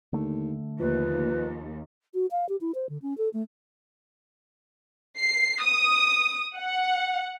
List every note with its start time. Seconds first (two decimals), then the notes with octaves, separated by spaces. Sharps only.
0.13 D#2 D3 A3
0.80 D#2 F3 B4
2.14 F#4
2.31 F5
2.49 G4
2.61 E4
2.75 C5
2.89 D3
3.02 C#4
3.18 A4
3.33 A3
5.18 C7
5.63 D#6
6.56 F#5